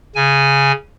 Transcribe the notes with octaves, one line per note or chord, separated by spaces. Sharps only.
C#3 G#5